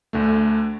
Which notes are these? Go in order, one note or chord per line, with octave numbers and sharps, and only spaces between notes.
D2 D3 A3